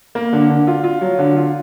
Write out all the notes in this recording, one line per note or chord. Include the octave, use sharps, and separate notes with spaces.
A#3
D3
D3
F4
F4
F#3
D3
F4